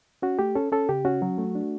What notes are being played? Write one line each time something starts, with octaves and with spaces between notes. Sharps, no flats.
C#4 F#4
A3 G4
C#4 A4
C#4 A4
C#3 G4
C#4 F#4
F#3
A3
D4